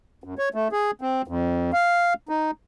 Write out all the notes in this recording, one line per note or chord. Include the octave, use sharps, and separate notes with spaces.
F#2
C#5
A3
G#4
C4
F2
F5
D#4